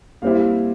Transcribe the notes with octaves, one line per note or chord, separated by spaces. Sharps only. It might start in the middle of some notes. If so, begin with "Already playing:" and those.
A#2 G3 C4 E4 F5